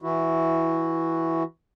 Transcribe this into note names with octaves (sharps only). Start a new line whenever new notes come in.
E3 E4 F#4